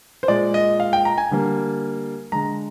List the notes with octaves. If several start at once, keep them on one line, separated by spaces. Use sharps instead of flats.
C5
A#2 G#3 D5
D#5
F5
G5
A#5
G#5
D3 G3 A#3
D3 G#3 A#5